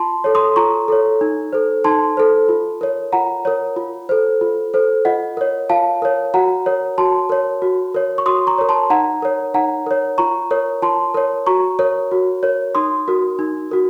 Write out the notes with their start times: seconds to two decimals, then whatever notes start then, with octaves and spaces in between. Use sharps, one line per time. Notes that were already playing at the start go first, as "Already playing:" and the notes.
Already playing: F4 A5 C6
0.24 A4 C#5
0.35 C6 D#6
0.56 F4 A#5 C#6
0.88 A4 C#5
1.21 D#4
1.53 A4 C5
1.84 D#4 A5 C6
2.17 A4 C5
2.49 F4
2.81 A#4 C#5
3.13 F4 F#5 A#5
3.45 A#4 C#5
3.76 F4
4.09 A4 C5
4.41 F4
4.74 A4 C5
5.05 F4 D#5 F#5
5.37 A#4 C#5
5.70 F4 F5 A5
6.02 A#4 C#5
6.34 F#4 F#5 A#5
6.66 A#4 C#5
6.98 F#4 A5 C6
7.29 A#4 C#5
7.62 F#4
7.94 A#4 C#5
8.18 C#6
8.26 F#4 C6 D#6
8.47 A#5 C#6
8.58 A#4 C#5
8.69 A5 C6
8.90 D#4 F#5 A#5
9.22 A#4 C#5
9.54 D#4 F#5 A#5
9.87 A#4 C#5
10.18 F4 A#5 C#6
10.51 A#4 C#5
10.82 F4 A5 C6
11.14 A#4 C#5
11.46 F#4 A#5 C#6
11.79 A#4 C#5
12.11 F#4
12.43 A#4 C#5
12.75 D#4 C6 D#6
13.08 F#4 A#4
13.39 D#4
13.71 F#4 A#4